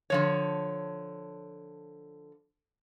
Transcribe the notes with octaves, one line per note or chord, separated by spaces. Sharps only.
D3 F3 C#5